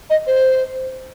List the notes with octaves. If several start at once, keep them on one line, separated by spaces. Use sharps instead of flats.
D#5
C5